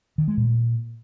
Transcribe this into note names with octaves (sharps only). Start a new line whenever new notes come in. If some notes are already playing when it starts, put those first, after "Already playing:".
D#3
G#3
A#2